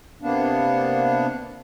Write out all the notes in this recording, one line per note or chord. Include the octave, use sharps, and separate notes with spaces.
C3 A#3 B3 D4